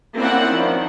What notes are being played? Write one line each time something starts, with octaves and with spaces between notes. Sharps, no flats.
A#3 C4 C#4 E4 D5 F#5
D#3 F3